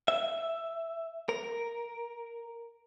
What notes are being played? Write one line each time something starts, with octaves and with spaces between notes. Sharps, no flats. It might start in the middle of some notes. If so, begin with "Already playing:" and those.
E5
A#4